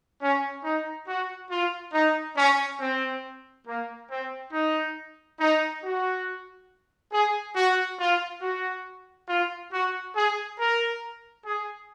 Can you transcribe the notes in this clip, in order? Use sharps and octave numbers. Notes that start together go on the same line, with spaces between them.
C#4
D#4
F#4
F4
D#4
C#4
C4
A#3
C4
D#4
D#4
F#4
G#4
F#4
F4
F#4
F4
F#4
G#4
A#4
G#4